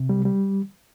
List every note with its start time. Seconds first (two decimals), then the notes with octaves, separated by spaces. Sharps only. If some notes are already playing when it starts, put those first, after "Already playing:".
Already playing: C3
0.09 G3
0.25 G3